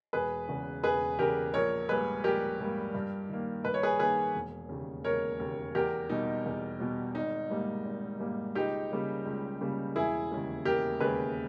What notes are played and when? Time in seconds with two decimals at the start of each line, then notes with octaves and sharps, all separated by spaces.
0.13 E1 G#4 B4
0.49 E2 C#3
0.84 E1 G#4 B4
1.19 E2 C#3 G4 A#4
1.53 A#1 A#4 C#5
1.88 G#2 G3 A#3 G#4 B4
2.24 A#1 G4 A#4
2.59 G#2 G3 A#3
2.94 G2
3.29 D#3 A#3
3.64 G2 B4
3.74 C#5
3.83 G#4 B4
3.99 D#3 A#3 G#4 B4
4.35 E1
4.69 D#2 C#3
5.04 E1 A#4 C#5
5.40 D#2 C#3
5.75 E2 G4 A#4
6.09 B2 G3 D#4
6.45 E2
6.80 B2 G3
7.15 G#1 D#4
7.50 G#2 G3 A#3
7.85 G#1
8.20 G#2 G3 A#3
8.55 C#2 D#4 G4
8.90 C#3 G3 A#3
9.25 C#2
9.61 C#3 G3 A#3
9.95 E1 E4 G#4
10.31 D#2 C#3 G#3
10.65 E1 G4 A#4
11.00 D#2 C#3 G#3 G#4 B4